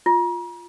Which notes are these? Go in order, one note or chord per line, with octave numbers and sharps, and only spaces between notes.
F4